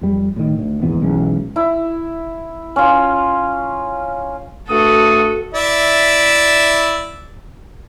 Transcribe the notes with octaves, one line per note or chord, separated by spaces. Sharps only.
F2 G3
A2 D#3
D2
D#2 G#2 E3 B3
B1 E3 G#3 C#4
E4
C#4 F4
G2 A3 F#4 A4 D#6
E4 D5 E5